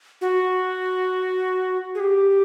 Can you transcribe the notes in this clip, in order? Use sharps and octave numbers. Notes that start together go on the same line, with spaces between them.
F#4
G#4
G4